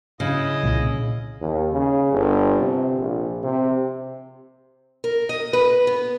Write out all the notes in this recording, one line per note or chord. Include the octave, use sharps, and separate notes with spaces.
C#3 E4 D#5
C2 A#2
D#2
C#3
G1
C3
A#1
C3
A#4
D#5
B4
B3